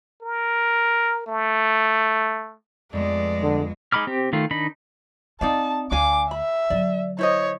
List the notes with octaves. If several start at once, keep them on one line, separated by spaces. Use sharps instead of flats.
A#4
A3
F2 G#3 A3 B3 D5
D3
G#3 D#4 B5 D6 F6
C4 G4
D#3 A3 F4
D#3 D4 D#4 B5
C4 D#4 D5 F5 A5
D2 D4 F5 G#5 D6
E5 B5
D3 F#3 D5
E4 C5 C#5 D#5